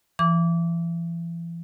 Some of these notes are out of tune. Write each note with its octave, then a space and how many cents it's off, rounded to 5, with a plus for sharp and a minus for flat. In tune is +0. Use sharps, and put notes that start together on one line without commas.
E3 +35 D6 -25